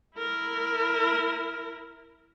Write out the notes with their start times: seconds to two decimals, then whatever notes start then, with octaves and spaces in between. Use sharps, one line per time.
0.18 E4 A#4